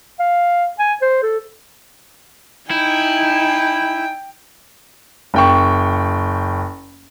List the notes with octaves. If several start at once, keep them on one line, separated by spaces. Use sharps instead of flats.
F5
G#5
C5
A4
D#4 E4 G5 G#5
F#1 G5 C#6